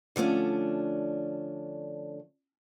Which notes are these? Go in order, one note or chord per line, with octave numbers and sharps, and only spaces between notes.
D3 F3 A3 C#4 D4